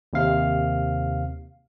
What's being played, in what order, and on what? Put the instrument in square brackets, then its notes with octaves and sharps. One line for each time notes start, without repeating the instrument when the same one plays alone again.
[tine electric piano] D#2 C3 F5